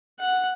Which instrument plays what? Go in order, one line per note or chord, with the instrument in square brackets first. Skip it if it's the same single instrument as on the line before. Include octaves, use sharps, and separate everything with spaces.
[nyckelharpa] F#5